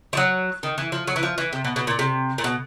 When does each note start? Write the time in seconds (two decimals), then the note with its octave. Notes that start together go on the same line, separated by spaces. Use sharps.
0.13 F3
0.17 F#3
0.63 D#3
0.78 E3
0.92 F3
1.07 F#3
1.16 E3
1.23 F3
1.38 E3
1.53 C3
1.64 B2
1.76 B2
1.87 A#2
1.99 C3
2.38 A#2
2.44 B2